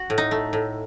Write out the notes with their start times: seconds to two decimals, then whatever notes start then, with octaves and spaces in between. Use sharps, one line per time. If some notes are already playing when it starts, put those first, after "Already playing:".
Already playing: F#4
0.10 A2
0.18 D#4
0.31 A3
0.53 A2